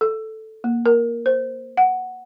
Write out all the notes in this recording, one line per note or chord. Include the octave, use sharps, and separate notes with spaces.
A4
A#3
A#4
C5
F#5